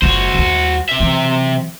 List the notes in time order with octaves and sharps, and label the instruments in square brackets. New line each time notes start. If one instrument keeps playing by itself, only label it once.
[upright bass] F#1 F4 [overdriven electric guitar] F#4 C5
[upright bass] D#2 G3
[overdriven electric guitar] C3 E5
[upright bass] E3 F#3